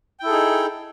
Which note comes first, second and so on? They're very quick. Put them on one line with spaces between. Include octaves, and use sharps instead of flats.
G5 E4 A4 G#4 D#4